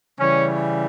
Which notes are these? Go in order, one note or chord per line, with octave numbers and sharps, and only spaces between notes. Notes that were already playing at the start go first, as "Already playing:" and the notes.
C#3 E3 G3 C#4